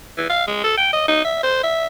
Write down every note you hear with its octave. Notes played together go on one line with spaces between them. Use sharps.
E3
F5
G#3
A4
G5
D#5
D#4
E5
C5
E5